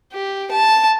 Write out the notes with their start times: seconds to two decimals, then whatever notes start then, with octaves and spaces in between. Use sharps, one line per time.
0.13 G4
0.51 A5